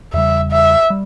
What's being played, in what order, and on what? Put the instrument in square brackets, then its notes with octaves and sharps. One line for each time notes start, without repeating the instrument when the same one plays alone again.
[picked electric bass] E2 C#3 G3 [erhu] E5
[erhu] E5
[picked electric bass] G3